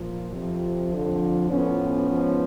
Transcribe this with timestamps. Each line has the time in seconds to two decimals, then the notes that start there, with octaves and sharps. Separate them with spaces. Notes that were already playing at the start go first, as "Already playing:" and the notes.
Already playing: A#2 F3
0.31 F2 C3 F3
0.91 F2 D3 F3
1.50 A2 F3 B3 C#4
2.10 G#2 F3